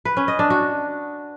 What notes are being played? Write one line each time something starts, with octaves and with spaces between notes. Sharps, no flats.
B4
C#4
D#5
D4
F#4